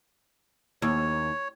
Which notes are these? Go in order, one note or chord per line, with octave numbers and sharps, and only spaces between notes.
D#2 C#5